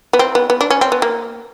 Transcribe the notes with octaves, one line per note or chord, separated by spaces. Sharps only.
B3
C4
B3
B3
D4
C#4
C4
B3
A#3